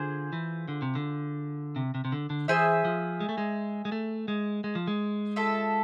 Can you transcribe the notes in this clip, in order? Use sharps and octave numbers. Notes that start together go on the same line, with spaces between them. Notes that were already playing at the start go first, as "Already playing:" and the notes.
Already playing: D3 F4 G#4 C5
E3
D3
C3
D3
C3
C3
C3
D3
D3
E3 G#4 C5 E5 G#5
F3
G#3
A3
G#3
G#3
A3
G#3
G#3
F3
G#3
F4 A4 E5